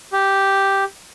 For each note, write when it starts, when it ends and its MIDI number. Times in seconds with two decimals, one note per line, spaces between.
0.13 0.84 67